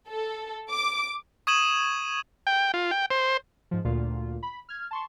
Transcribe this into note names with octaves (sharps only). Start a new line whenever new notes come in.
A4
D6
C#6 D#6 G#6 D#7 E7 F#7
G5
F4
G5
C5
G#2 F3
D2 A#2 F4
B5
F6 G#6
A5 C6 C#6